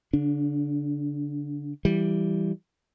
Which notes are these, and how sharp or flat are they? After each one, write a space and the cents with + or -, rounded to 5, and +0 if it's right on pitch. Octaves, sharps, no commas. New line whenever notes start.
D3 -40 D4 +0
E3 +10 G3 +0